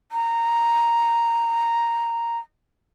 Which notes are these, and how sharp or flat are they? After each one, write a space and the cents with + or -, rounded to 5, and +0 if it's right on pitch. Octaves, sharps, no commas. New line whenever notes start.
A#5 +0